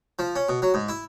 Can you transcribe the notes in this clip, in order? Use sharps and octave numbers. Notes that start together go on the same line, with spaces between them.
F3
C#4
B2
F#3
G#2
E4